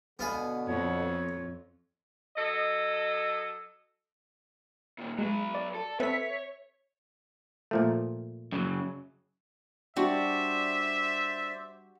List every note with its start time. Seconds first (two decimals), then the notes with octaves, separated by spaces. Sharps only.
0.19 B2 D3 B3 F5 G#5
0.67 F2 C#5
2.36 F#3 A4 D#5
4.98 A#2 D#3
5.19 F#3 G#3 B4
5.55 D5
5.75 A4
6.00 C4 A4 B4 C#5 E5 B6
7.71 A#2 F3 A3
8.52 F#2 C#3 F#3
9.97 G3 D4 F#4 C5 D5 E5